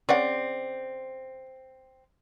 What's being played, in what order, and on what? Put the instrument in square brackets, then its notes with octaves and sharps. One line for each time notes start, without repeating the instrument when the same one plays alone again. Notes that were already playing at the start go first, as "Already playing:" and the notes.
[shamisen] C#3 C#5 F#5 [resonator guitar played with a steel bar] C4 [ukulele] D5